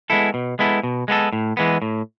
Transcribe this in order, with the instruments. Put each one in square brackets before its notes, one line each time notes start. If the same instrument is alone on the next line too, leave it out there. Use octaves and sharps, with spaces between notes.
[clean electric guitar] G#3 B3 E4 A4
B2
G#3 B3 E4 A4
B2
G#3 B3 E4 A4
A2
E3 G#3 B3
A2